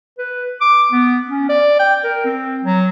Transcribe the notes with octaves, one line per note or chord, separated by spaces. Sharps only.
B4
D6
B3
C#4
D5
G5
A#4
C4
F#3